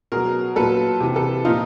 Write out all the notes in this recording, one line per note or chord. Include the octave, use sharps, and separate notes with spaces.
B2 F#3 G#4 A#4
A#2 F#3 A4 B4
C3 E3
A4 B4
A#2 F3 D#4 F4